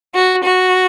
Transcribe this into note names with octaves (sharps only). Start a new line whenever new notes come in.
F#4
F#4